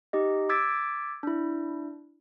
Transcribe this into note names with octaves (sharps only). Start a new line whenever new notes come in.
D#4 G4 D#5
D6 E6 G#6 A6 B6 D7
D4 E4